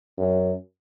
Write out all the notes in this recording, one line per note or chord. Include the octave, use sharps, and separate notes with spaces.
F#2